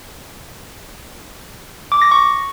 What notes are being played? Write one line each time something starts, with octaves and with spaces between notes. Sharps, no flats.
D6
A#6
C#6